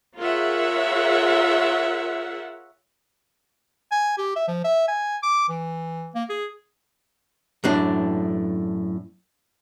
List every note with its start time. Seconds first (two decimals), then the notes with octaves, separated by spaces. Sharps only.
0.18 F4 G#4 A#4 C#5 E5 F#5
3.91 G#5
4.18 G4
4.36 E5
4.48 F3
4.64 E5
4.88 G#5
5.23 D6
5.49 E3
6.14 A#3
6.29 G#4
7.64 F#2 A2 D4